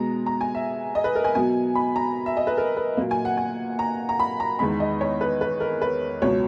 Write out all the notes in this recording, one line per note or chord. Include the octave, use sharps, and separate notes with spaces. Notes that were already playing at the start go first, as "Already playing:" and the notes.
Already playing: B2 G#3 B3 A#5
A#5
G#5
E5
D#5
B4
A#4
G#5
B2 F#3 B3 G#5
B5
A#5
E5
D#5
B4
A#4
B4
A#2 F#3 A#3
G#5
F#5
G#5
A#5
A#5
B5
A#5
E2 D#3 G#3 B5
D#5
C#5
B4
B4
A#4
B4
C#2 B2 F#3 C#5